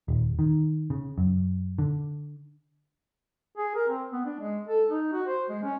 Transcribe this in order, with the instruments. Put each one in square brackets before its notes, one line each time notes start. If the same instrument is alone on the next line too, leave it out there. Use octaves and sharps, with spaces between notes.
[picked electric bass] D#1
D#3
C#3
F#2
D3
[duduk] G#4
A#4
C4
B3
D4
G#3
A4
D#4
F#4
C5
G#3
C#4